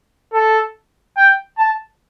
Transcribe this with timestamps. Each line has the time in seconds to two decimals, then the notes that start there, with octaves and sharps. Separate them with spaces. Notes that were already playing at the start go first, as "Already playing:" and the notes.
0.33 A4
1.17 G5
1.58 A5